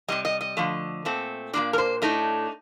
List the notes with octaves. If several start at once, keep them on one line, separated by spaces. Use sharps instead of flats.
C3 D#3 G3 D#5
D#5
D#5
D3 F3 A3
A#2 A3 C4
A#2 F3 A#3 D4 D5
A#4
C5
A2 A3 D4 D#4